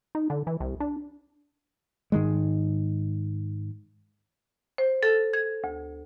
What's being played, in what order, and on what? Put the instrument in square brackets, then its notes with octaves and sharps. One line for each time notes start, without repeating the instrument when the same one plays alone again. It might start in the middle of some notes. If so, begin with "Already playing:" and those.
[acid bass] D#4
D3
E3
C2
D4
[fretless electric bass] G#2 D#3 G#3
[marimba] C5
A4
G#6
D2